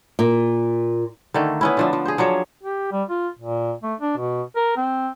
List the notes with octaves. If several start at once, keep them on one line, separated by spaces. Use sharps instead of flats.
A#2
D3 D#3 A3 A#3
B3 C#4 E4
D3 F3 D4
F3
G#4 C5
F3 F#3 D4 C#5
G4
G3
F4
A#2
A3
D4
B2
A#4
C4